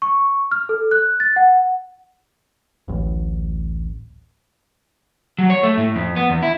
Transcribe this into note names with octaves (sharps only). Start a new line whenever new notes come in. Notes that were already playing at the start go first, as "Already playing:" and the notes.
C#6
F6
A4
F#6
A6
F#5
D1 A1
F#3
C#5
A3
A2
F2
B3
E2
E4